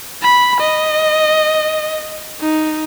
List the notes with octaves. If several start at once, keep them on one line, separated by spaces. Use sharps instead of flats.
B5
D#5
D#4